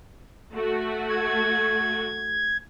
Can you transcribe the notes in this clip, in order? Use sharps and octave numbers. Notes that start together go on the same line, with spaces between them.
A3 F#4
G#6